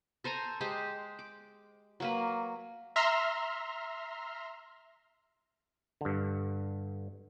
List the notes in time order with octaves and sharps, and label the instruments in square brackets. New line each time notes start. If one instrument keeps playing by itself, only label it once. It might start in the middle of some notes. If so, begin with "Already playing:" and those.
[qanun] A4 C5 G#5 A#5
G#3 G4 C5
D6
F#3 A#3 B4
[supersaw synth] E5 A#5 C6 F6
[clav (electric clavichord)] G2 D3